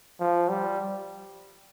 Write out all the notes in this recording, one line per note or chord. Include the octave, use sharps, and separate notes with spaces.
F3
G3